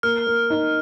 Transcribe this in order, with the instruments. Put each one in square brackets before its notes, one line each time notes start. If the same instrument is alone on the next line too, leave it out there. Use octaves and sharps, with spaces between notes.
[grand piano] A#3 [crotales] F6
[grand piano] A#3
D#4